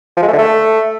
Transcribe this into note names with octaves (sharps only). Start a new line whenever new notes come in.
F3
G#3
A3
D3
A3